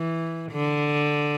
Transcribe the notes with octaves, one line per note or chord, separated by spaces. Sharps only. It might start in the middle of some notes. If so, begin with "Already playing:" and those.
Already playing: E3
D3